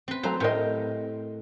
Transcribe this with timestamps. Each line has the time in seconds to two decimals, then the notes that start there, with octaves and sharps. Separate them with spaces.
0.08 C4 B4
0.23 F#3 A3 C5 A#5
0.40 A2 C4 G4 A#4 D#5